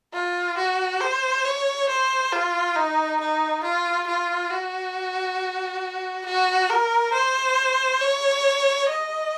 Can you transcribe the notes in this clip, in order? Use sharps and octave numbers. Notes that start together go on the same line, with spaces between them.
F4
F#4
C5
C#5
C5
F4
D#4
D#4
F4
F4
F#4
F#4
A#4
C5
C#5
D#5